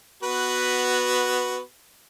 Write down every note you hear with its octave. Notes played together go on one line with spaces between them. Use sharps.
B3 F#4 B4